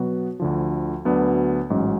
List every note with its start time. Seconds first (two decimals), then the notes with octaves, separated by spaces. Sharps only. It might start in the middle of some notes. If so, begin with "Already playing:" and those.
Already playing: B2 F#3 B3 F#4
0.40 D2 D3 F3
1.05 D2 D3 F#3 B3 D4
1.70 A1 G#2 F#3 C#4